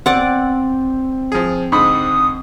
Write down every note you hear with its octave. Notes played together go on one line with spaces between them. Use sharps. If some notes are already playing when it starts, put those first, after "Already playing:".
C4 D5 F#5
F3 G#4
G#2 D3 B5 D#6